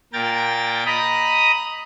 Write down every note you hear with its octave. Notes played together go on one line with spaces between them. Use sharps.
A#2 A#4 G5 A6
D#5 A#5 B5 D#6